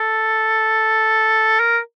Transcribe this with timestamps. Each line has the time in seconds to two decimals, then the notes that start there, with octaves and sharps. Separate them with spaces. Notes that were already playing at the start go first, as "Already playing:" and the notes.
Already playing: A4
1.60 A#4